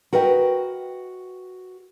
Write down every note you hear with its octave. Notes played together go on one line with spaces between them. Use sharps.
F#4 A#4 B4 D#5 G5